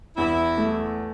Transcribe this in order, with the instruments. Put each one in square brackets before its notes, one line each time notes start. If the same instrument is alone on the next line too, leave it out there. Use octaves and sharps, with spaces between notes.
[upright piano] E2 [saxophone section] E4
[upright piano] A3